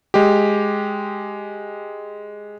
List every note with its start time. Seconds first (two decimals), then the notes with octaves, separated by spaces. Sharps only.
0.14 G#3 G4